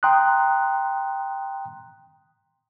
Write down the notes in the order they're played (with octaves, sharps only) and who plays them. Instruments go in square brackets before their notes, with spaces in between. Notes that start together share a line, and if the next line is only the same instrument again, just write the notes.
[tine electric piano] G5 A#5 C6 D#6 F#6